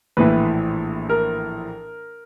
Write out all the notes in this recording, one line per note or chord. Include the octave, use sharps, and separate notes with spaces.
A#1 A2 E3 B4
A#4